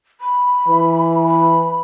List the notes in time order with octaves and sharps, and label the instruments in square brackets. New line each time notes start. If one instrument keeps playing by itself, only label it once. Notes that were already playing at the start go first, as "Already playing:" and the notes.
[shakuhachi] B5
[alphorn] E3
[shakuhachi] B5